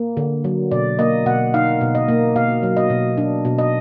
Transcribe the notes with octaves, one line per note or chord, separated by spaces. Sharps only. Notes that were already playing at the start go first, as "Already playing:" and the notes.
Already playing: A#3
D3
F#3
B2 D5
A#3 D#5
B2 F#5
D#4 F5
B2
D#5
A#3
B2 F5
F#3
D#5
B2
D4
B2
D#5